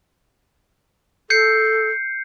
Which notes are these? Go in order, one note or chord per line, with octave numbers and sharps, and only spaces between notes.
A4 G6 C7 C#7